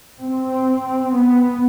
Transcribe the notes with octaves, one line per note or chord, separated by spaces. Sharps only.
C4
B3